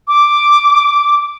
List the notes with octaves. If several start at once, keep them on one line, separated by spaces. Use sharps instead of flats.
D6